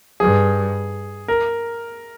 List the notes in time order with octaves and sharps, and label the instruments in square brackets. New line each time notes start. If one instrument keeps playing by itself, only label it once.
[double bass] G2 [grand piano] G#4
[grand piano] A#4